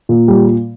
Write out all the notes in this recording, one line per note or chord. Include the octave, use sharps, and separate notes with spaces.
A#2
G3